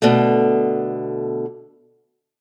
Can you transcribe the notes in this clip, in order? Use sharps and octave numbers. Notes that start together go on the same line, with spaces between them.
B2 D3 A3